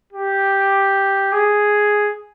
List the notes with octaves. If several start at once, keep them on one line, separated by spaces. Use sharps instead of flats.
G4
G#4